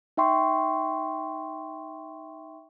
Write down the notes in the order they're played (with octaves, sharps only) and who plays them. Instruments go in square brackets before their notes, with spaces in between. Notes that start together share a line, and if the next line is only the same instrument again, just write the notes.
[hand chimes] D#4 E5 G5 C6 C#6